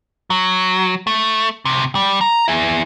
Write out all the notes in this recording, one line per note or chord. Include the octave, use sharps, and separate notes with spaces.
F#3
A3
D2 C3
G3
A#5
E4 G#4